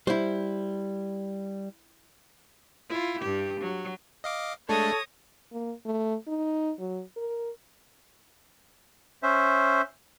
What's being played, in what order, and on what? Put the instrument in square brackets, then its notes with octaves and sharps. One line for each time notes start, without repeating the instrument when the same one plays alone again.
[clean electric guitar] G3 [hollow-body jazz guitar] E4 C5
[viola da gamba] E4 F4
G2 G4
F#3
[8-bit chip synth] D#5 F5 D6
[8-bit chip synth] G#3 A3 D4 [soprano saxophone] A4 [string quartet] C#5 D#6 A#6
[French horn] A#3
A3
D#4
F#3
A#4
[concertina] C#4 C5 E5